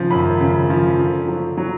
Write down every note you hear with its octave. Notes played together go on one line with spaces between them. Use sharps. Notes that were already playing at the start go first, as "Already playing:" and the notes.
Already playing: G#1 C#3 F3
F#2 B5
C#3
F3
D3
F#3
F#3